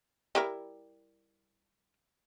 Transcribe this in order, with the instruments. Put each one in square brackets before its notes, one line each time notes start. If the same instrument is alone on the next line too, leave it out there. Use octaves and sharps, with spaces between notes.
[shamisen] G3 E4 A#4